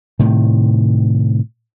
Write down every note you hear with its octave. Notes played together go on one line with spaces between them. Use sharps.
A2 C3 D#3